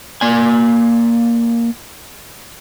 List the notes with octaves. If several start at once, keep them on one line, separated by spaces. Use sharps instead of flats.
A#3 D5 G#5